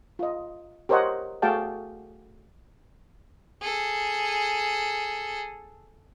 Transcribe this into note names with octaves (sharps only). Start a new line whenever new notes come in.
F4 D#5
G4 A#4 C5 C#5 D#5 F#5
A3 F#4 G#4 F5 G5 A5
G#4 A4